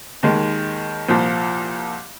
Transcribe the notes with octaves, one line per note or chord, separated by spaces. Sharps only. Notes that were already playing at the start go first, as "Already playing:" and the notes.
D#2 D#3 G#3
C2 A#2 F3